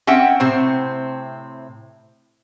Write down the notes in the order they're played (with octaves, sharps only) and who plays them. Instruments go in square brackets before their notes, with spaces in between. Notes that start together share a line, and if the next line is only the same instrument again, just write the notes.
[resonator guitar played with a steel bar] C4 C#4 E5 F#5 G5
A2 C3 C4